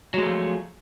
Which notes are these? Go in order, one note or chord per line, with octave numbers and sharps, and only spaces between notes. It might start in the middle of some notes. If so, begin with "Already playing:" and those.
F3 F#3 G#3 A3